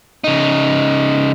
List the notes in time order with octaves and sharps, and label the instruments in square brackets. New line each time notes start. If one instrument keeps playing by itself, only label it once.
[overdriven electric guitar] C#3 D#4